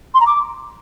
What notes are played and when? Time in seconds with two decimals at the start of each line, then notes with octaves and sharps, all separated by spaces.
0.14 C6
0.20 A#5
0.26 D6